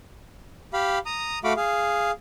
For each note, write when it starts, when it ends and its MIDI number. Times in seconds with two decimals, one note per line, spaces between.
0.73 0.99 67
0.73 0.99 77
0.73 0.99 83
1.06 1.39 82
1.06 1.39 87
1.44 1.53 57
1.44 1.53 66
1.44 1.53 77
1.44 1.53 83
1.44 1.53 86
1.57 2.11 68
1.57 2.11 77